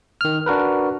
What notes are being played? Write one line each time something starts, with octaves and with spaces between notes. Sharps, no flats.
D#3 F6
D4 F#4 A#4 B4